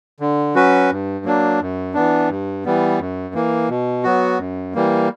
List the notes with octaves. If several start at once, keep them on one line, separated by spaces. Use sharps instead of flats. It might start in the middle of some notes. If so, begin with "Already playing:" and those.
D3
F#3 C#4 F#4 B4
G2
F#3 A#3 D4
F#2
E3 B3 D4
G2
E3 G3 B3
F#2
E3 A#3
B2
F#3 B3 F#4
F#2
E3 G3 A#3